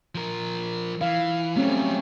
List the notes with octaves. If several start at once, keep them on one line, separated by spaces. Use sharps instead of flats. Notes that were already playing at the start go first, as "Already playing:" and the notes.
F3 A#4
E3 F5
F#3 G3 A3 C4 C#4